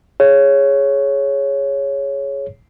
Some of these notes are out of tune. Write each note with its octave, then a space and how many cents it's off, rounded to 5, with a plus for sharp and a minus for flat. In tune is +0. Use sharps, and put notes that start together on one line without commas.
G#4 +0 C#5 +0